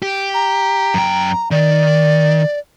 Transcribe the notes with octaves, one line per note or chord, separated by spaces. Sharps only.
G4
A#5
F#2 G5
D#3 D5